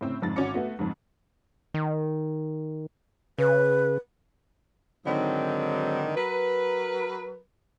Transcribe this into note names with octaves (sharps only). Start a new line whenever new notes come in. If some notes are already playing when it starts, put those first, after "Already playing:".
A2 C#3 C4 E6
F2 G#2 A6
G#1 C#4 F#4 D6 C#7
A3 B3 F#4
F2 G#2
D#3
C#3 B4
G#2 D3 D#3 F#3 C4
F#3 A#4 B4